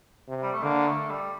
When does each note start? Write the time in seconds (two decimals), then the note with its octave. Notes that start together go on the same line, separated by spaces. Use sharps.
0.28 C3
0.42 G3
0.53 A3
0.63 D3 A#3
0.87 A3
1.10 G3